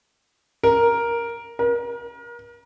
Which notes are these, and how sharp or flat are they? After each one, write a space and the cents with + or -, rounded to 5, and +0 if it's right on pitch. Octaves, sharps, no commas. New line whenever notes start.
A#4 +5
A#4 +35